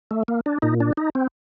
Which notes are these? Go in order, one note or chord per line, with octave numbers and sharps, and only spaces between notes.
A3
A#3
D4
A#2 D#4
D4
D#4
C4